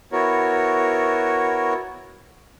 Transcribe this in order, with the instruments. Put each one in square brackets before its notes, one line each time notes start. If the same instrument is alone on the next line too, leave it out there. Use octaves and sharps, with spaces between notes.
[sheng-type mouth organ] B3 E4 F#4 A#4 C#5